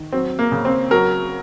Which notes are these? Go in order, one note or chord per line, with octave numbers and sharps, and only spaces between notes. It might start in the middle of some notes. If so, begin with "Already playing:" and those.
Already playing: D#3
F#3 C4
A#3
C#3
C4
F#3 A#4